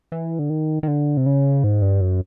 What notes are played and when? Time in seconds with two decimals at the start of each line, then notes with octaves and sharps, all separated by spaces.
0.12 E3
0.39 D3
0.50 D#3
0.83 D#3
0.88 D3
1.17 C3
1.26 C#3
1.64 G#2
1.82 G2
2.01 F#2